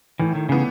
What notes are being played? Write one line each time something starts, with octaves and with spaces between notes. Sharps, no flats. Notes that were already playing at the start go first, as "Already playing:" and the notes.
A2 E3
D#3
C#3 E3 B3